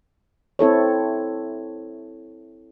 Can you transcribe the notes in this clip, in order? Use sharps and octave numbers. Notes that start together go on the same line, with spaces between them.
C4 E4 A4 C#5